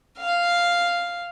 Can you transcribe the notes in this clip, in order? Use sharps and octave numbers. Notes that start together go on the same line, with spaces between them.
F5